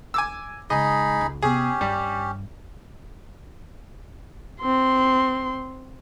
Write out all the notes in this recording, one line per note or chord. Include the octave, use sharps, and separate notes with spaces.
G#5 D6 E6
C#3 G#3 D#4 G#4 D#5 B5
C#2
C3 B3 C#4 G4 G#4
G2 G3
C4 C6